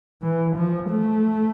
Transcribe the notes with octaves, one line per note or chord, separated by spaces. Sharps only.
E3
F3
A3